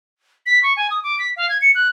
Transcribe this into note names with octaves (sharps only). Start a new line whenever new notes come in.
B6
C#6
G#5
D#6
D6
B6
F5
G#6
C#7
F#6